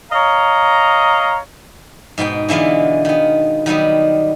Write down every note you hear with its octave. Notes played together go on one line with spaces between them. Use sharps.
C#5 D#5 F5 A#5
G#2 B2 B3 G5
D3 E3 G#3 B3 F4
D#3 B3
D#3 F#3 G3 B3